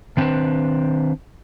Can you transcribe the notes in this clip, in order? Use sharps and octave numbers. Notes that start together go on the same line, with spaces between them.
D#3 C4 D4 B4 C5